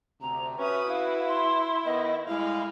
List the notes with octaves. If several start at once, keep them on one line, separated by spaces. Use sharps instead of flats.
D2 C3 A#5
C#4 F#4 B4 E5 D#6
E4 F5
C6
D#3 B3 D#5
A2 G3 G#3 E4 F5